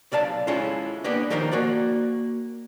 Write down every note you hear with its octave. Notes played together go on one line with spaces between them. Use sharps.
B1 D5 F5 A5
G#3 C#4 E4 F4 A4
A#3 B3 D4 G4
D#3 F3 D#4 G4 A#4 C5
A#3 F#4 D5